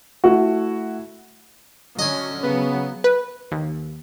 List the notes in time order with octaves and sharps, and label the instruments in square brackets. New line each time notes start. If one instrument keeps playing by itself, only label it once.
[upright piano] A3 E4 F#4
[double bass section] D3 F#3 C#4 [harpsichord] D#5 G#5
[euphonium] C#3 [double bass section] F#3 [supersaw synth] B3
[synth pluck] B4
D#2